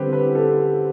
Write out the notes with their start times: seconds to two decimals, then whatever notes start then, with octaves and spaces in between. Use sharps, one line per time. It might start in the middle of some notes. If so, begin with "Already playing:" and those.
Already playing: D3 G3 C4 G4 B4 C5
0.13 B4
0.35 A4